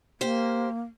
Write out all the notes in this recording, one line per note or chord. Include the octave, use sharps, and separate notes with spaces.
A#3 G4 C5